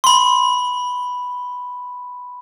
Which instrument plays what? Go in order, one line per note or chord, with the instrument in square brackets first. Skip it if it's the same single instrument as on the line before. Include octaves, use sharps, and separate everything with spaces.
[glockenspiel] B5 C6